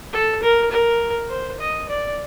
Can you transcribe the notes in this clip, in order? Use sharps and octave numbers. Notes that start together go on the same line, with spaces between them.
A4
A#4
A#4
C5
D#5
D5